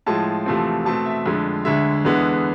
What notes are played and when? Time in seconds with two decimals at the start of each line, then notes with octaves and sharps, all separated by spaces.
0.06 A2 F3 G#3 A5
0.46 E2 C3 F3 A3 C4
0.85 B2 A3 C4 A5
1.06 E5
1.26 F2 D3 G#3
1.65 D2 D3 G#3 E5
2.05 E2 D3 G#3 B3